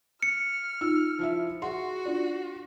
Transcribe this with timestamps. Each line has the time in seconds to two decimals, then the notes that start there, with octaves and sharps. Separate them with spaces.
0.23 F6 C#7
0.81 D#4 F4 E6
1.19 F3 E4 E5
1.62 F#4 G#4 F#5 C6
2.05 D4 F4 D5